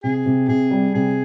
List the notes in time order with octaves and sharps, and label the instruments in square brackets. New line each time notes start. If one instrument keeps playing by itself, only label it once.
[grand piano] C3 [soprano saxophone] G#4
[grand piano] C3
[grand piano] C3 [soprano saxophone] G#4
[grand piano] G3
[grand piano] C3 [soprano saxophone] G#4